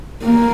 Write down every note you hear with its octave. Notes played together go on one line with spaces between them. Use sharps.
A#3